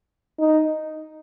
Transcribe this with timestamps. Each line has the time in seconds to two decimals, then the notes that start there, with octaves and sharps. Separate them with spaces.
0.39 D#4